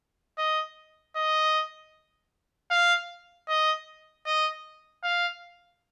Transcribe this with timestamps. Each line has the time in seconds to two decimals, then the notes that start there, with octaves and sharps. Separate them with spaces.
0.38 D#5
1.16 D#5
2.71 F5
3.48 D#5
4.26 D#5
5.03 F5